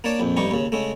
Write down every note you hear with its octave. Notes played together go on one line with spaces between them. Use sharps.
A#3 D4 C#5 D5 A5
A#1 F2
A1 G2 G3 D#4 C#6
D#2 C#3
C#3 G#3 A3